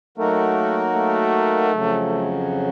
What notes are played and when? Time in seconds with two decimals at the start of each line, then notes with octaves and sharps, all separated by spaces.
0.18 F#3 A3 A#3 D#4 F#4 A#4
0.95 A3
1.71 F2 C#3 F#3